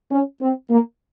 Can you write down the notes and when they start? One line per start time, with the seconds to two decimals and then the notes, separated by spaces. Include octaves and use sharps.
0.10 C#4
0.40 C4
0.70 A#3